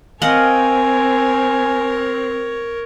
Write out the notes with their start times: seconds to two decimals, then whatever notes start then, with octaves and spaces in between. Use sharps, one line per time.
0.22 C4 A#4 C#5 D#5 F5 F#5 G#5